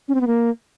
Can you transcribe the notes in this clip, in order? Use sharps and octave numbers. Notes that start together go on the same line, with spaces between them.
C#4
C4
B3
A#3